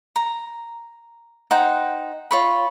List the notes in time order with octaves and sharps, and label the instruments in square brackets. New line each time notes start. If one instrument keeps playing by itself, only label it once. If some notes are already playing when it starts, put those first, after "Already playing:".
[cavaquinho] A#5
D#4 C5 F#5 G5
F4 C#5 B5